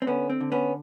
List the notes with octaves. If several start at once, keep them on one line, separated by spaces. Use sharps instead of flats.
C4
D3 B3 C#4
C4
D3
B3 C#4